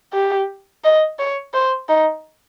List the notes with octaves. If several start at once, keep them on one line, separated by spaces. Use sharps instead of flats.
G4
D#5
C#5
C5
D#4